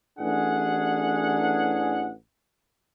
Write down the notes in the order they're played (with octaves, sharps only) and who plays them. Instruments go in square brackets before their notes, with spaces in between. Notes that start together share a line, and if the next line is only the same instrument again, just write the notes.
[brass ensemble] A1 D4 G#4 F#5